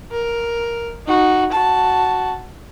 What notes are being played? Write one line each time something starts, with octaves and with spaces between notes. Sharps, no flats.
A#4
D#4 F#4
F#4 A5